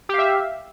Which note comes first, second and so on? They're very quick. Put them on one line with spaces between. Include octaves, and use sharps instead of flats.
G4 F5 E5